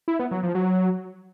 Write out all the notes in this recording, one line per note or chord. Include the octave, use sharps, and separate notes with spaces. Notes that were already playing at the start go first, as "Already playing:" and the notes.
E4
B3
F#3
F3
F#3